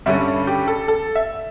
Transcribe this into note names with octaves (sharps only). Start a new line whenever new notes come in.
G2 D3 G3 C#4 E5
G4
A4
A4
E5